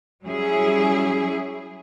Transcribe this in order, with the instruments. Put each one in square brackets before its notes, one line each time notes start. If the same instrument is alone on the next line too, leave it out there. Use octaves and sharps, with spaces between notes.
[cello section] F#3 G3 C#4 E4 G#4